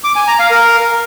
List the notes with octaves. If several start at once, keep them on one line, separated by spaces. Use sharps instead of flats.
D6
G#5
A#5
F5
A#4